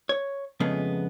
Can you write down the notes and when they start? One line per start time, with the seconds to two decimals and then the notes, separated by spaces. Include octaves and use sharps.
0.09 C#5
0.60 F2 C#3 G#3 A3 B3